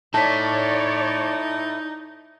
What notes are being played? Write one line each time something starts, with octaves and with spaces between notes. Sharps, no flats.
D#4 E4 A4 C#5 D5 A5 B6